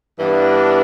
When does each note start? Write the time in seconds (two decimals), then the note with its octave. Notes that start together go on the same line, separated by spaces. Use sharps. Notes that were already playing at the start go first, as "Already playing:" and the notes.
0.19 G2 E3 B3 D4